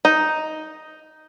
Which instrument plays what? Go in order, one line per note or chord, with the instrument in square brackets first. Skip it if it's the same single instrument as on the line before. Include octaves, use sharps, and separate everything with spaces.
[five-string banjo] D#4